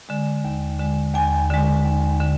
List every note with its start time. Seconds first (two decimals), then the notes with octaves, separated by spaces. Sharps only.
0.09 D3 G#3
0.45 D#2
0.79 D3 G#3
1.14 D#2 G#5
1.50 D3 G#3
1.85 D#2
2.20 D3